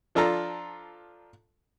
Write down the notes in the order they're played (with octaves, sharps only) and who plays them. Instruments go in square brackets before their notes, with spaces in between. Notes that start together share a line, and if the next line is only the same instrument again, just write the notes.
[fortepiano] F3 D4 F4 A4 A#5